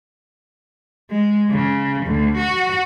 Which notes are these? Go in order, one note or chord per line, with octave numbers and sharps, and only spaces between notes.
G#3
C#3
D2
F#4